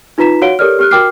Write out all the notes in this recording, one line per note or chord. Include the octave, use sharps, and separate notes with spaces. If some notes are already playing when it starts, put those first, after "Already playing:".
D#4 F4 B4 A#5 B6 E7
F#4 C#5 F5 F#5 D7 G7
G4 A4 A#4 C#5 D5 F6
G4 F6 F#6
F#4 A#4 G5 D6 F6 C7